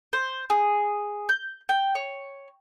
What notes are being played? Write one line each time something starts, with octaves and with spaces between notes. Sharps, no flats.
C5
G#4
G6
G5
C#5